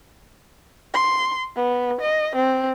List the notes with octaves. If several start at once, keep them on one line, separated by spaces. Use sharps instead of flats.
C6
B3
D#5
C4